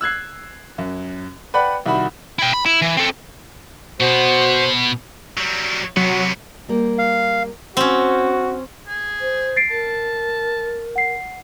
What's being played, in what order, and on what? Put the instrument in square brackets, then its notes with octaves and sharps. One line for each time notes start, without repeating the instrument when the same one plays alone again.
[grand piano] E6 F#6 G#6 C7
F#2
B4 D5 F#5 G5 B5
C2 D#3 F#4 B5
[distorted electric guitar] E4 G5
B5
E4
E3
C4 A4
[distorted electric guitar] B2 B3 [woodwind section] F#4 C5
[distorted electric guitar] F#3 G3
[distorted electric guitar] C3 B3 [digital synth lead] F#3
[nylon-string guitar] G3 A#3 G4
[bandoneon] F5
[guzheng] C4 C#4 [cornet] F#4
[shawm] G#4
[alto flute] C5
[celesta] A6 C7 D7
[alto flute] A#4 [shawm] A5
[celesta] F#5 C7